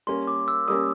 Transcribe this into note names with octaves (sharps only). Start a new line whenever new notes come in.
G3 A#3 C#4 C6
D6
E6
G3 A#3 C#4 D#6